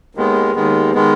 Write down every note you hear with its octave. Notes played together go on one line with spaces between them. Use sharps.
D#2 D#3 G#3 B3
D#2 D#3 G#3 B3
D#3 G#3 B3